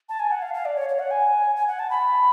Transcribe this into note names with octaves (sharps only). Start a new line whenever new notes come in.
A5
G#5
F#5
F5
F5
D5
C#5
C#5
F#5
G#5
G#5
F#5
A5
B5